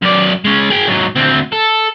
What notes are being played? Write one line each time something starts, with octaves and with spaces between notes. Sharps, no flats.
F#2 D5
G#3 C#4
G#4 G5
G#2 F#3
D2 C4
A4